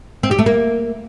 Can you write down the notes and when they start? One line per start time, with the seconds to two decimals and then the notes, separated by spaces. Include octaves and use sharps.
0.23 C4
0.31 G4
0.39 A3
0.46 A#3